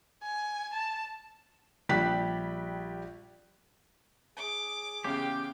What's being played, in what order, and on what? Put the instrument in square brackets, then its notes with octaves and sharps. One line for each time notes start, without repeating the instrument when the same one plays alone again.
[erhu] G#5
A5
[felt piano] A#1 G3 G4 F#6 B6
[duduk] G#4 [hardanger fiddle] D6
[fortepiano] E2 C#3 [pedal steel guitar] G4 [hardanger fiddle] F5 G5